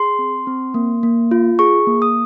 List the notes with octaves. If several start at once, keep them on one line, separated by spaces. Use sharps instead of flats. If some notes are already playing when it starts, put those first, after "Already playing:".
Already playing: G#4 C6
C4
C4
A#3
A#3
F4
G#4 C#6
A#3
D#6